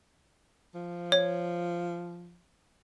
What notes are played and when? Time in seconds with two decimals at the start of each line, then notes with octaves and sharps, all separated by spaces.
0.75 F3
1.12 C#5